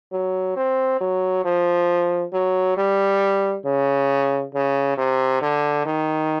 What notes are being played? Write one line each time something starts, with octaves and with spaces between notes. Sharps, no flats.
F#3
C4
F#3
F3
F#3
G3
C#3
C#3
C3
D3
D#3